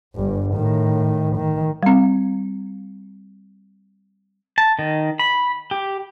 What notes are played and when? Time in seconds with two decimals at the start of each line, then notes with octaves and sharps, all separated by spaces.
0.15 G1 G2
0.54 A2 D#3
1.36 D#3
1.83 G3 C4
4.58 A5
4.79 D#3
5.19 B5
5.71 G4